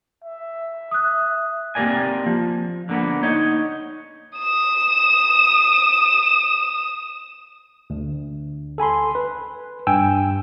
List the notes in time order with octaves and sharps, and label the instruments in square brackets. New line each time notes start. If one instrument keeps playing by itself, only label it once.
[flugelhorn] E5
[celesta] D#6 F#6
[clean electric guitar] A#3 C4 G4 A#4 D5 G#5
F3
D3 A#3 B3
D#4 C#5
[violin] D#6 E7
[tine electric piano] D2
A4 G#5 B5 C6
B4
G2 G5 G#5 E6